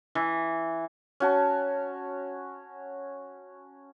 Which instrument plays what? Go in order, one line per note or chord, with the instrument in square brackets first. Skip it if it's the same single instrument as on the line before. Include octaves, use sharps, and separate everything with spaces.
[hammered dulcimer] E3
[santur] C#4 F#4 A5